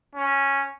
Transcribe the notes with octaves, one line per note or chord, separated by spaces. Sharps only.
C#4